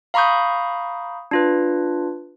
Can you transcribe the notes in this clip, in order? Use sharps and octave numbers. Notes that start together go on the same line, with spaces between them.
F5 A#5 B5 C#6 D#6 G6
D4 F4 B4